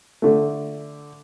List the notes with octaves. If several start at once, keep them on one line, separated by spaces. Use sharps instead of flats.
D3 A3